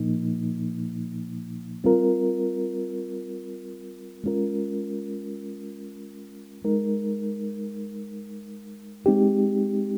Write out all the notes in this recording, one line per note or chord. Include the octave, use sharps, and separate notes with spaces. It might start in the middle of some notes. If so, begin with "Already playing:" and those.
Already playing: A#2 F3 A#3 D#4
G3 C4 F4 A#4
G#3 C#4 F4 A#4
G#3 D#4 A#4
G#3 C4 D#4 G4